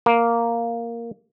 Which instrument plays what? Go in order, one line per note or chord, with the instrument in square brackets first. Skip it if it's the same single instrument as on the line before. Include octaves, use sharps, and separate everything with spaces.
[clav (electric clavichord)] A#3